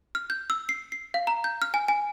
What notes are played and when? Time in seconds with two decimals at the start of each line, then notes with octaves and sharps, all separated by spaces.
0.15 F6
0.30 G6
0.50 E6
0.69 C7
0.92 C7
1.14 F5
1.27 A#5
1.44 G6
1.62 F6
1.74 G#5
1.88 G#5